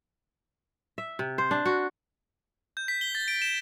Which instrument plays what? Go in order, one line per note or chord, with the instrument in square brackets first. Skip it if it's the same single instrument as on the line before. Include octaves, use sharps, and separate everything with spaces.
[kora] E5
C3
C5
D4
F#4
[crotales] G6
B6
G7
A6
D7
E7